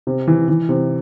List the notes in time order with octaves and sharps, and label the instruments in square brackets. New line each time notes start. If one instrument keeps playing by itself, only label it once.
[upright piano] C3
E3
E3
C3